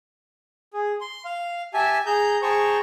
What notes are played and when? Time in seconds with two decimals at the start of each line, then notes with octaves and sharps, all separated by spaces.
0.73 G#4
1.01 C6
1.25 F5
1.74 G4 E5 G#5 A5
2.06 G#4 A#5 G6
2.42 G#4 C5 G5 A5 A#5 C#6